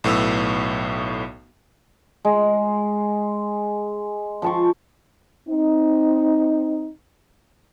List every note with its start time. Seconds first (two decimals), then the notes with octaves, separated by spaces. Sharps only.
0.04 B1 A2 B3 E6
2.25 G#3
4.42 F3 A5 C#6
5.49 C4 D#4